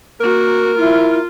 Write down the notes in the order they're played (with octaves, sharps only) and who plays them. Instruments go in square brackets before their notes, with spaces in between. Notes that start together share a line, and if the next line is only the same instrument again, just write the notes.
[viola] A#3 F#4 [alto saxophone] A#4
[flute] E4 [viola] F4